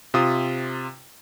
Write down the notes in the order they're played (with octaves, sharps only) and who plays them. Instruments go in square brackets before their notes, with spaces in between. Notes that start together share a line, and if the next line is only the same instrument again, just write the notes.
[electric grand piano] C3 F4 D#6